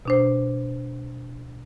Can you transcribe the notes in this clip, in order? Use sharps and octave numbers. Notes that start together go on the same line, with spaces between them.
B2 D4 C5